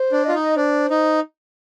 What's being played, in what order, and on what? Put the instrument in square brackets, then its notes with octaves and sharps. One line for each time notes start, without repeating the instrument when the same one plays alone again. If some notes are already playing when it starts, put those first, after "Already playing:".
Already playing: [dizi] C5
[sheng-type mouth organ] D4
[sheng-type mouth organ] F4 [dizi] D#5
[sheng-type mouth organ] D#4
[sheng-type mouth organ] D4 [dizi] C5
[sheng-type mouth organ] D#4